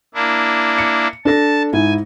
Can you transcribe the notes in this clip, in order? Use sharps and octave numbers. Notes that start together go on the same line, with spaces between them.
A#3 D4 E4
C#7
D4 A4 A5 A#6
G#2 E4 G#5